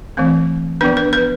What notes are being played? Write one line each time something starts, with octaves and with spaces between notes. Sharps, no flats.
E3 A3 C4
F3 B3 D4 B4
B4
B4